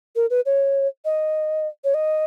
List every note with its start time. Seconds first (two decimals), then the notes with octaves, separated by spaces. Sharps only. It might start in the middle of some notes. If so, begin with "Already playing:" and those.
0.16 A#4
0.30 B4
0.46 C#5
1.05 D#5
1.84 C#5
1.94 D#5